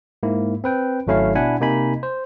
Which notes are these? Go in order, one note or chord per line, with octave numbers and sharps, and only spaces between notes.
G#2 A#3 E4
C4 B4 G5
G#1 F#3 A3 C#4 E4 F5
B2 D4 E4 F#5 G#5 B5
C3 A#3 D#4 G#5 B5
C5